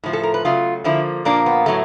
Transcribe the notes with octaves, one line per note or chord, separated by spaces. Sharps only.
A2 F3 A3
A4
A#4
B4
C#3 F#3 A3 F4
D3 F3 A#3 E4
A#2 F3 A#3 D4
B3
A2 F#3 A3